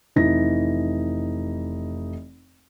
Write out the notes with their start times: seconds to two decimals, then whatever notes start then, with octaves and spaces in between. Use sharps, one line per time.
0.16 F1 E3 D#4 A#6